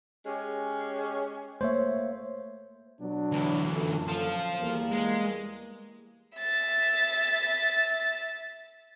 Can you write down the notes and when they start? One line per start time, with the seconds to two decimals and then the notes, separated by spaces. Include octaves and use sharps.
0.25 G#3 C#4 G4
1.61 A3 A#3 C5 C#5 E5
3.00 B2 F#3 D4
3.33 D2 E3
3.74 F#2 A#2 A4
4.08 F4 C5
4.60 E2 G3 A#3
4.92 G#3
6.38 E5 A6